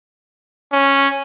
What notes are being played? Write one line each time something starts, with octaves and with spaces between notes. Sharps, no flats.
C#4